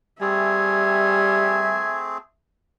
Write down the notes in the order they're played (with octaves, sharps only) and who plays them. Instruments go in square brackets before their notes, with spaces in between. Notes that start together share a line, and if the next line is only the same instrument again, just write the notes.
[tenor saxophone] G3 [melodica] A3 C4 G#4 [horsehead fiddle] E5 [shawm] G#5